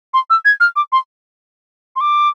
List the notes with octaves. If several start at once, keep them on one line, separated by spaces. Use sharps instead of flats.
C6
E6
G#6
F6
D6
C6
C6
D6